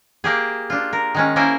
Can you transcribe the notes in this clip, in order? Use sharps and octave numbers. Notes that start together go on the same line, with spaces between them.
A#3 G4 G#4
D4 F4
A#4
D#3 G#3 C#4
A#3 C#4 E4 A#4 C5 G#5